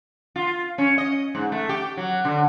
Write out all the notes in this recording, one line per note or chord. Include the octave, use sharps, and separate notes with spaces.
F4
C#4
D#5
G#2
A3
G4
F#3
D3